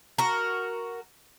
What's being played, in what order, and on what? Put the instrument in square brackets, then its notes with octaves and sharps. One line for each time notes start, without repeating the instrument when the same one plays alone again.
[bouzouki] F#4 A#4